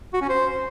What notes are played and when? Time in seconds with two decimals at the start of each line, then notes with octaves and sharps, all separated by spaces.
0.14 F#4
0.21 C#4
0.29 C5